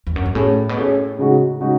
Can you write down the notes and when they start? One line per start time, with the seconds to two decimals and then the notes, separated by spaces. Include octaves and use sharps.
0.07 E2
0.16 F#2
0.26 G#2
0.35 A2 A3 C#4 G#4
0.69 B2
0.77 A2 A3 C#4 G#4
1.18 C#3 G#3 D#4 F#4
1.60 C#3 G#3 D#4 F#4